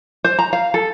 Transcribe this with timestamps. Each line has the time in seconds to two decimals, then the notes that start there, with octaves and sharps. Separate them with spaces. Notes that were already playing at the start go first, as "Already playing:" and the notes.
0.24 C5
0.39 A#5
0.53 F5
0.74 A4